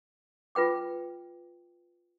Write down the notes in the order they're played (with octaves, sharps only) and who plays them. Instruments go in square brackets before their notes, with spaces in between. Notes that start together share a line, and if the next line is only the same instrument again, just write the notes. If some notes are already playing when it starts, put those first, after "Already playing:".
[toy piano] F4 B4 G5 D6